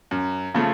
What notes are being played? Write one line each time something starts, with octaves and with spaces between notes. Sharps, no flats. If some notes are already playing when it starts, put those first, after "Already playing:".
F#2
C#3 F3 A3